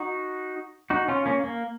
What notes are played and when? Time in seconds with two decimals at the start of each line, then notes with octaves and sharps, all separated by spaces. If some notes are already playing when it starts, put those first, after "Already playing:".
Already playing: D#4 F#4
0.90 D#4 F#4
1.08 C#4 F4
1.26 A#3 C#4
1.44 A#3